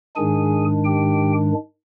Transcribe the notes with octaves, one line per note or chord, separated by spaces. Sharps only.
G#2 D#3 G#3 D4 G#4 G#5
G4 G5